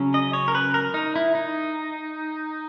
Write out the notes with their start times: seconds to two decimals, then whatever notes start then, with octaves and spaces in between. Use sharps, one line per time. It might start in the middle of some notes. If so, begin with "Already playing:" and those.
Already playing: C#3 F#3 C#4
0.14 D#5
0.33 C#5
0.48 A#4
0.55 B4
0.74 A#4
0.94 D#4
1.16 E4
1.35 D#4